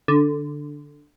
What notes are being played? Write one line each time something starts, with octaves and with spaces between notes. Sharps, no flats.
D3